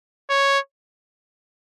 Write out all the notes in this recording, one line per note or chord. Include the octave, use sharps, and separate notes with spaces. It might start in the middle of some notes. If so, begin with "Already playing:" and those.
C#5